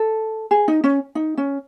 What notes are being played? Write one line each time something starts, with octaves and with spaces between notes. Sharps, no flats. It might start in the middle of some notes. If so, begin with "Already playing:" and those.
Already playing: A4
G#4
D#4
C#4
D#4
C#4